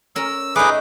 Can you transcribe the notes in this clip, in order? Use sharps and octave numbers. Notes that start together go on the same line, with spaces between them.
C#4 A#4 E6
A3 D#4 G#4 B4 D6